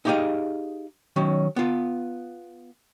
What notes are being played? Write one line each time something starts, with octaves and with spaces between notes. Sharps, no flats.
D#4 E4 G4 G#4 D#5 F5
D#3 F#3 C#4
B3 F4